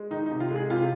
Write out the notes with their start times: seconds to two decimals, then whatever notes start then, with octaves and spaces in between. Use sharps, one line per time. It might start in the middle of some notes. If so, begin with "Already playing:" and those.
Already playing: G#3
0.11 D#3 D#4
0.26 D#4
0.31 C3
0.40 F4
0.50 G#3
0.56 G#4
0.70 C3 F4